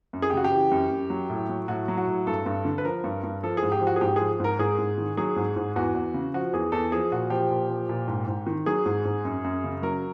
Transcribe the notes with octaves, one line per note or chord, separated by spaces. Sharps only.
F#2
G#4
G4
C#3 F#4
G4
E3
F#2
F#2
F#3
A2
F#3
A2 F#4
F#3
F#4
A2
G2 A4
G2
D3
B4
F3 A#4
G2
G2
F3 A4
G#4
G#2
G4
F3
F#4
G#4
G#2 G4
F3 G#4
G#2 A#4
G#2 G#4
G#2
D#3
F#3 G#4
G#2
G#2
E2 F#4
E2
C#3
F3 F#4
E2 G#4
E2 A4
F3 G#4
A#2 F#4
F3 G4
A#2
F3
A#2
G#2
G#2
D#3
F#3 G#4
G#2
G#2
F#2
F#2
C#3
F#3 A#4